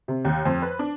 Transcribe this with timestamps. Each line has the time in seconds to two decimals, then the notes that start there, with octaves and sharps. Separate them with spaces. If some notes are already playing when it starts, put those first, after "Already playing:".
0.08 C3
0.25 D#2
0.46 F2
0.62 B4
0.79 D4